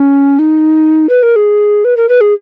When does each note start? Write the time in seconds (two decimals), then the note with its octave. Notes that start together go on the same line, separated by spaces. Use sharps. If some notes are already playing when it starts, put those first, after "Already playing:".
Already playing: C#4
0.39 D#4
1.09 B4
1.23 A#4
1.36 G#4
1.85 B4
1.97 A#4
2.09 B4
2.21 G#4